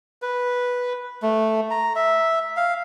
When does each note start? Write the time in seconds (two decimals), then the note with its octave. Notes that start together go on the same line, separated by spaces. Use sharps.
0.22 B4
1.22 A3
1.71 A#5
1.96 E5
2.57 F5